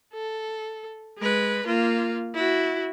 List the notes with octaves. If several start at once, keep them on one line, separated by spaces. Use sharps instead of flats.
A4
G#3 B4
A#3 F4
E4 F#4